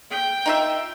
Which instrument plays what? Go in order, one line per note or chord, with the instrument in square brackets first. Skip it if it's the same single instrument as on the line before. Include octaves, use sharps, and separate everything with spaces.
[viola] G5
[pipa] D#4 F4 E5